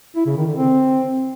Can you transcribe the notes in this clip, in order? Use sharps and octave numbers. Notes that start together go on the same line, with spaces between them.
E4
C#3
D#3
D3
C4